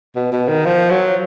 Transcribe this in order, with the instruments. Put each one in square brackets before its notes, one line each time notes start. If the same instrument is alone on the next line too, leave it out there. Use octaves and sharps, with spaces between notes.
[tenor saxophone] B2
B2
D#3
F3
F#3